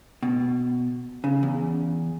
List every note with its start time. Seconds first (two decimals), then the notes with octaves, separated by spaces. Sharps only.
0.23 B2
1.24 C#3
1.43 E2